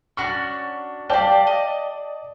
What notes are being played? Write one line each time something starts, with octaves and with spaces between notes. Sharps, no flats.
C#4 D4 F#4 C#6
G4 D5 F5 A5
D#5